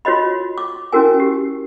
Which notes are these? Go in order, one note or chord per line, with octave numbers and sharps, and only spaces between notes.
F4 F#4 C#5 D#5 B5
D6
C#4 E4 F#4 A#4 G#5
G4